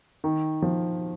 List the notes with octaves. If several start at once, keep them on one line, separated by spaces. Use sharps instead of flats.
D#3
F3